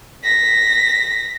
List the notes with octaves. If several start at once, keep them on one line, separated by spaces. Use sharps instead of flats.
A#6 B6